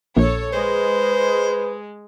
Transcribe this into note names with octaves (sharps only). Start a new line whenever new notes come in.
A#1 A4 C#5
G#3 B4 C5